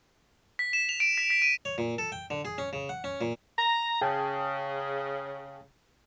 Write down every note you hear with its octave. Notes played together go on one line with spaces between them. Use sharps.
B6
E7
F7
D7
B6
B6
D#7
C#5
A#2
A4
G5
D3
G#4
C#4
C#3
F#5
C#4
A#2
A#5
C#3 G#4 G5 A5